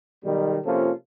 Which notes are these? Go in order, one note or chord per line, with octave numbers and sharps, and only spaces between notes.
B1 D#3 G3
C3 F3 A#3 C#4 F4 A4